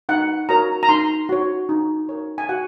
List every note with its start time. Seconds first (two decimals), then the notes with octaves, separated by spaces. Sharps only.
0.09 D#4 F#5
0.49 F#4 A#4 C#5 A#5
0.83 A#5
0.89 D#4 C6
1.29 F#4 C#5
1.69 D#4
2.09 A#4 C#5
2.38 G#5
2.49 F#4 F#5